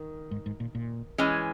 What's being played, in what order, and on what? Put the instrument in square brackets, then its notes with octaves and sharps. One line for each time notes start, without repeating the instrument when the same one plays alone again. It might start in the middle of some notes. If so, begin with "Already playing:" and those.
Already playing: [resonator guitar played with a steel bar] D#3
[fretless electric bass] G#2
G#2
A#2
A#2
[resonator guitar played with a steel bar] E3 G#3 C#4